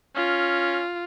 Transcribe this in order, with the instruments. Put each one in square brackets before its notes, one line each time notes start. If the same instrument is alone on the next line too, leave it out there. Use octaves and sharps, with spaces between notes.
[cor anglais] C#4 [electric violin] F4